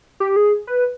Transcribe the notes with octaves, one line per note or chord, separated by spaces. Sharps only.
G4
G#4
B4